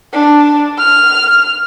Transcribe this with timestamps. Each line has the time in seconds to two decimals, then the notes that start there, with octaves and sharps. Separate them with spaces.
0.13 D4
0.78 F6